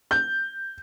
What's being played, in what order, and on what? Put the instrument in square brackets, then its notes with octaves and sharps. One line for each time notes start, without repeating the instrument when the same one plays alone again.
[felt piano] G6